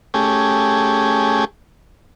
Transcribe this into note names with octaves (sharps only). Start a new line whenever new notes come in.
A3 C#4 G4 G#4